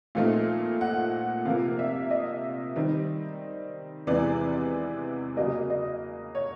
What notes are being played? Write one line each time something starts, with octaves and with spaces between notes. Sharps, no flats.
A#2 F3 A3 C4 D#4 F5
F#5
C3 F3 A#3 F5
E5
D#5
D#3 G3 C4 D#4
E2 C3 E3 G#3 B3 D5
C#3 F#3 A#3 D#5
D#5
C#5